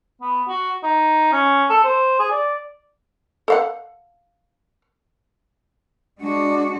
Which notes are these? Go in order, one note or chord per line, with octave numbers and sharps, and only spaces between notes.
B3
F#4
D#4
C#4
A4
C5
G#4
D5
A4 F5 F#5
G#3 D4 F#4